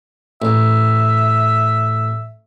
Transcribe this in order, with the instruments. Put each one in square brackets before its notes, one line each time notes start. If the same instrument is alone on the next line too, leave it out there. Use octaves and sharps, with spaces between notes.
[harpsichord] A1 [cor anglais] E5